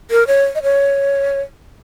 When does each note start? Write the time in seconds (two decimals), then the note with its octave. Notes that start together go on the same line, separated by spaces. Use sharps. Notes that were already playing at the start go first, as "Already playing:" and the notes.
0.11 A#4
0.27 C#5
0.55 D#5
0.63 C#5